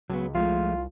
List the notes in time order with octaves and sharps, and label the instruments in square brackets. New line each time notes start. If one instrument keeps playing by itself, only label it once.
[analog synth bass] C#2 [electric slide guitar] F#3 B3
[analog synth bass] C2 [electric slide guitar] F3 G#3 A3 [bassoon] F4